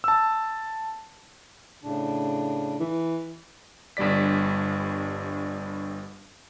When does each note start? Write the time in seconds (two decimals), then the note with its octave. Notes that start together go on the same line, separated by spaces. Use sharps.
0.04 A5 E6
1.83 A2 C#3 D4
2.80 E3
3.97 G1 G2 G3 D5 B6